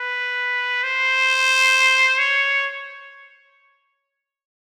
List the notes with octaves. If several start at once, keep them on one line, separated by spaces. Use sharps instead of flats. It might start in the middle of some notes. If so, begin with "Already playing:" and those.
Already playing: B4
C5
C#5